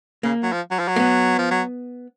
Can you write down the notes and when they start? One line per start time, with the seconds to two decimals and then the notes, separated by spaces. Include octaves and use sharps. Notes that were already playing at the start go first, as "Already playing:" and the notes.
0.23 C#3 A#3
0.43 F#3
0.52 F3
0.71 F#3
0.79 F3
0.88 F#3
0.96 A#3
1.00 B3
1.38 F3
1.51 F#3